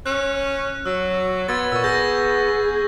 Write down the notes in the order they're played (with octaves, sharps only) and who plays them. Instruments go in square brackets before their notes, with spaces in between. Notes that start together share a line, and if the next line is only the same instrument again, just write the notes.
[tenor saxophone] C#4 [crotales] F#6
[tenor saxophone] F#3 [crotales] E6
[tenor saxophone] B3 [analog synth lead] C6 [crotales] E6 G#6 A6
[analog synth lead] A#2 [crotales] C#6 E6
[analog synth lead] G#4 [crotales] E6 G6 A#6